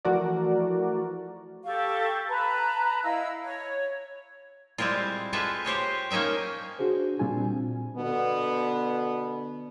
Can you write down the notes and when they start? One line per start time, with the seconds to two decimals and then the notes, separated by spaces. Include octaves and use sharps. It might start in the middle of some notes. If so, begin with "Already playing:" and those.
0.05 E3 F3 A3 F#4 A#4 D5
1.64 G4 A4 F5 C#6
2.29 B4 A5 A#5
3.03 E4 D#5 F5 E6
3.43 C#5
4.78 G3 G#3 C4 E4 F4
5.33 G#3 F4 G4 A4 B4 E5
5.65 G4 C5 C#5 D#5
6.10 A#3 C#4 D#4 E5 G5
6.79 D4 F#4 G#4 C5
7.20 A#2 G3 C4 D4 F4 G#5
7.96 B2 D3 B3